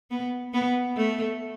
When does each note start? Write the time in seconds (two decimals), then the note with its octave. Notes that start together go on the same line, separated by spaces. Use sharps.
0.11 B3
0.53 B3
0.97 A3